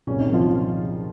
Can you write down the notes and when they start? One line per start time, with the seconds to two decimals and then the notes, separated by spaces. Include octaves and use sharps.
0.07 C2 A#2 C#3 F#3 C#4
0.20 D#3 D#4
0.33 F3 F4